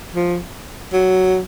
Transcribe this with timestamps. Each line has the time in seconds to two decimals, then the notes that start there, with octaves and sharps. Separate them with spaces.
0.14 F3
0.93 F#3